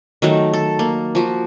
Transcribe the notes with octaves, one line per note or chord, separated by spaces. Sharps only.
D#3 F#3 A3
A4
A#3
F3 F#4